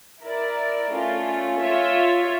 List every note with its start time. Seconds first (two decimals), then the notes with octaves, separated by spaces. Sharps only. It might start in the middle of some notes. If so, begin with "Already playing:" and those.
0.23 E4 A#4 D5
0.93 A3 C#4 F4
1.61 F4 C#5 E5